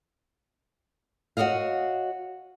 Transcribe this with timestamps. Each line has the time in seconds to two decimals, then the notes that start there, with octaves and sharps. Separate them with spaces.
1.37 F#4 A4 C#5 D#5 F5